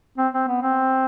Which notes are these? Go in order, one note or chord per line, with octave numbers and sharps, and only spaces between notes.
C4
C4
B3
C4